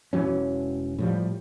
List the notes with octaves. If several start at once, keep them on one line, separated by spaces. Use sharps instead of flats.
E1 E3 F#3 C#4
A2 F3 G3